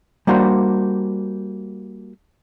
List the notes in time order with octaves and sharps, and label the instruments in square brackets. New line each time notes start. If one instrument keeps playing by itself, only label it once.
[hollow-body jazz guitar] G3 A#3 D4 F#4 C5